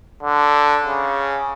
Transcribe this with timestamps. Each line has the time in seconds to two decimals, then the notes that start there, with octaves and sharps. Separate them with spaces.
0.23 D3
0.85 C#3